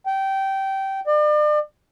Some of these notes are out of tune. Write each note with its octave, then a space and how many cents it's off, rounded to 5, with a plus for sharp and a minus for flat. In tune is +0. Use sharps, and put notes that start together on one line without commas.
G5 -20
D5 +40